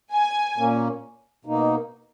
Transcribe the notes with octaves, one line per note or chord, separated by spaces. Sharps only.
G#5
A#2 A#3 C#4
B2 A#3 D#4